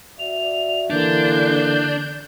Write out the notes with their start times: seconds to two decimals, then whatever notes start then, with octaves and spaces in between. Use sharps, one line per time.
0.19 F#4 D5 E5 F7
0.90 D3 E3 A#3 D4 G6